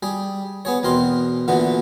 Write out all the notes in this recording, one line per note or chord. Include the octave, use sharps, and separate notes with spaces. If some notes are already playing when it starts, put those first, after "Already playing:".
G3 G#4
B3 G#4 C#5
E2 B2 C4 A#4 C6
A#2 D3 E3 B3 F#4